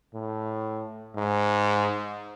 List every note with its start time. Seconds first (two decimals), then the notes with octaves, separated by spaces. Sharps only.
0.14 A2
1.16 G#2